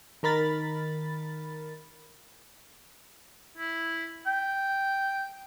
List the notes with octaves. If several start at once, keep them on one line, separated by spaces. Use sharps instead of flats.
D#3 A#4 B5 A6
E4
G5